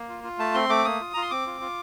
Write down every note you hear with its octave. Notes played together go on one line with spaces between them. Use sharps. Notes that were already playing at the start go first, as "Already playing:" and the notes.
Already playing: A#3
F4
F4
A3 A5
C4 C6
A3 D6
A#3 D#6
F4
F4 A#5
C6
C4 D6
F4
F4